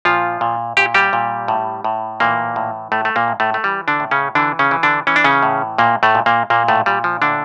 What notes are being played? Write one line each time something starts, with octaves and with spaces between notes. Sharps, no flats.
A#2 F3 F4
A#2
A#2 G4
G3 G4
A#2
A2
A2
A#2 E3 A#3
A2
A2 A3
A3
A#2 A#3
A2
A2 A3
A3
E3 G3
D3 D4
A2
C#3 C#4
D3 E3 D4
C#3 C#4
E3
D3 D4
E3 C#4
D4
C#3 C#4
A2
A#2 A#3
A2 A3
A#2
A#2 A#3
A#2 A#3
A2 A3
A#2 G3
F3
A2 D3 D4